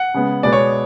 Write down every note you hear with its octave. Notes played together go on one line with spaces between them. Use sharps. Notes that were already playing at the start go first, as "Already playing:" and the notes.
Already playing: F#5
C#3 G#3 B3
B2 G#3 B3 D5
C#5